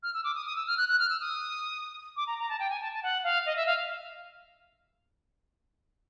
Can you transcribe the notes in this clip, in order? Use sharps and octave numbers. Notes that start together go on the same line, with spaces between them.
F6
E6
D6
D#6
D#6
E6
F6
F#6
F#6
F6
E6
D#6
D6
A#5
A#5
A5
G5
G#5
A5
A5
F#5
F5
D#5
E5
F5